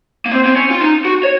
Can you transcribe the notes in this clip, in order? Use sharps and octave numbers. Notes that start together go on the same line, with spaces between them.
A#3
C4
C4
C#4
F4
D#4
F#4
C#5